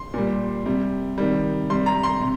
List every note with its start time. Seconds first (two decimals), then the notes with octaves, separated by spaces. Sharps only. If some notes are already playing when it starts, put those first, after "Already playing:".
Already playing: C6
0.14 A#2 G3
0.66 C3 G3
1.18 C3 D#3 G3
1.70 C3 G3 C6
1.86 A#5
2.03 C6
2.21 C3